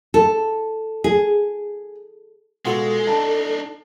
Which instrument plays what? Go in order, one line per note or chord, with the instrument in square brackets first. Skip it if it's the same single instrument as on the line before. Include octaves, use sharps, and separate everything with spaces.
[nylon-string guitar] A4
G#4
[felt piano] B2 F4 [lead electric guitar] G#3 [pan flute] A4
[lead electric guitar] D4 D#4 [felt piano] A5